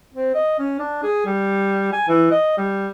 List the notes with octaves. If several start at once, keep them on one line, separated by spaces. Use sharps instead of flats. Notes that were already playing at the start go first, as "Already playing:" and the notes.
C4
D#5
C#4
D4
G#4
G3
G#5
E3
D#5
G3